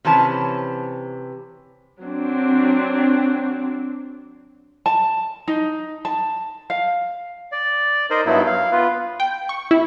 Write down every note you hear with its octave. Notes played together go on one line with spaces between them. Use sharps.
C3 E3 C#4 A5
F#3 C4 D4
A5
D#4
A5
F5
D5
D#4 A#4 C5 D#5
G2 F#3 B3 D#4 E4
F5
B3 F4 B4
G5
C#6
E4